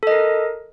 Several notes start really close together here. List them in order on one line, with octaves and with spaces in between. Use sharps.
A4 D#5 A#4